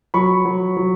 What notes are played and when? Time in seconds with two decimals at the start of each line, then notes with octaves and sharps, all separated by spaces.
0.14 F#3 B5 C#6
0.45 F#3
0.77 F#3